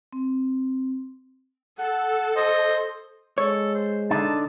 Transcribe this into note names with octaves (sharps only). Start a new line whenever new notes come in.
C4
A4 F#5
C5 D#5
G#3 A4 C#5
C5
D3 D4 D#4 A5